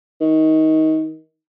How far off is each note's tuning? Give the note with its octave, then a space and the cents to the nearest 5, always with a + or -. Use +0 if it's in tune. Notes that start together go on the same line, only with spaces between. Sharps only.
D#3 +20